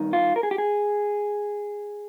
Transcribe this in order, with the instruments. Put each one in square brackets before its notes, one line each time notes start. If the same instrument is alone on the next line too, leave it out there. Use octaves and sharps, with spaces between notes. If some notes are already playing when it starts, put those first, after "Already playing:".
Already playing: [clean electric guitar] G2 D#3
F4
A#4
G#4
G4
G#4